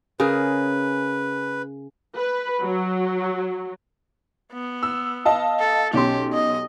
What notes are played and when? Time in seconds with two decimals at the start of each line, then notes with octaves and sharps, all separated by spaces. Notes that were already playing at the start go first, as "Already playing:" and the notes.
0.20 C#3 G#4 A#4 B4
2.16 B4
2.63 F#3
4.53 B3
4.83 E6
5.25 D#5 F5 A5
5.60 A4
5.93 B1 C#4 G4 C6
6.33 D#5